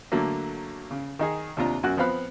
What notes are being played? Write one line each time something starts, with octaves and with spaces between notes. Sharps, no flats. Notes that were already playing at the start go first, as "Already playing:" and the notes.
D3 F#3 A3 A#3
C#3
D#3 D#4 G#4
D#2 C3 D4 F4 A#5
F#2 F#4 F#6
F3 B3 C4 F5 B5 F#6